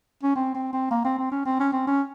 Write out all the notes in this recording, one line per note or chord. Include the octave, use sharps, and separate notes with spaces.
C#4
C4
C4
C4
A#3
C4
C4
C#4
C4
C#4
C4
C#4